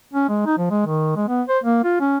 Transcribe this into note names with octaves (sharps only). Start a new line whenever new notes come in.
C#4
G#3
D#4
F3
G#3
D#3
G#3
B3
C5
A#3
F4
C#4